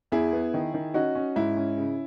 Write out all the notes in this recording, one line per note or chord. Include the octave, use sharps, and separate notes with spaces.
E2 E4 G#4
B3
D#3
D#3
C#4 D#4 F#4
C#4
G#2 E4
C#4
C#3